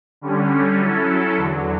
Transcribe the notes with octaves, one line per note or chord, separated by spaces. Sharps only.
D3 G3 C#4
F#3 C#4 E4 A4
E2 D3 F#3